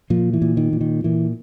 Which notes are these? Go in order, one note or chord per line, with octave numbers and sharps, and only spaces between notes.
A#2 F3
E3
A#2
D#3
A#2
D#3
A#2 E3